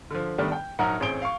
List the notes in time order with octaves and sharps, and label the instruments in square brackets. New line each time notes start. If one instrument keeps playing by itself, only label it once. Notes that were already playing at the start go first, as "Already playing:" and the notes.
[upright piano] D3 F3
D#3 G3 A3 B3 D4
G5
A#1 F#3 D#4 A#4 F#5 A#5
A1 C4 C#4 G#4 D7 G7
F5 C#6